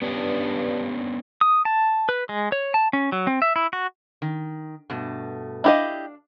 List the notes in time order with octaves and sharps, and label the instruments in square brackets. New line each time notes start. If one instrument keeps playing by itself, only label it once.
[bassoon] G2 [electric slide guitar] B3 C#4 D4
[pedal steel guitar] D#6
A5
B4
G#3
C#5
A5
C#4
F#3
C4
E5
E4
F#4
[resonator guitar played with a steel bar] D#3
G2 B2 A3
[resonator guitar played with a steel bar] D4 F5 [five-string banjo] E4 G4 D#5